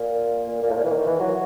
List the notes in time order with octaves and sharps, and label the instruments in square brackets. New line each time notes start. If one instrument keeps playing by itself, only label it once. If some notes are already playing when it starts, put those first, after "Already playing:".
Already playing: [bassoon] A#2
A#2
A#2
A2
A#2
E3
D#3
E3
F#3